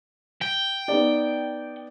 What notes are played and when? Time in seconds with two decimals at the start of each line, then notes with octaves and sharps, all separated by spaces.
0.41 G5
0.88 B3 D#4 D5